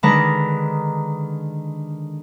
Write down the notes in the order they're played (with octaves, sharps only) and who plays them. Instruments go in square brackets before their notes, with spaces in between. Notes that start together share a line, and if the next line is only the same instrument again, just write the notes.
[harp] D3 D#3 G#3 B4 A5 A#5